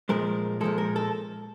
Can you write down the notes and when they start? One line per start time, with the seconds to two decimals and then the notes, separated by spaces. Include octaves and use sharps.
0.09 A#2 F3 G#3 A#4
0.61 A#2 F3 G#3 A4
0.78 A#4
0.96 A4